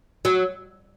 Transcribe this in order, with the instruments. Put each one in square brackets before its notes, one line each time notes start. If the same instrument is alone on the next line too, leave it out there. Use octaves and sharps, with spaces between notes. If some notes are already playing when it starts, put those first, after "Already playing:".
[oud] F#3